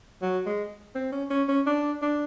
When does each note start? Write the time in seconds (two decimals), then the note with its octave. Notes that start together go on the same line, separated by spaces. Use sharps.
0.22 F#3
0.46 G#3
0.95 C4
1.12 C#4
1.30 C#4
1.48 C#4
1.66 D4
2.02 D4